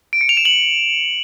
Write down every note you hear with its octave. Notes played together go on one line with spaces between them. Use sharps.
D7
C#7
F7
E7
F#7